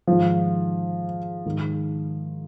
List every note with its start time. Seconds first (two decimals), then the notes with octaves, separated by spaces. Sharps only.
0.07 G#2 D#3 F3
1.46 G#2 D#3